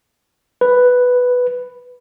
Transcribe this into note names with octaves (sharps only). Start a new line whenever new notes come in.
B4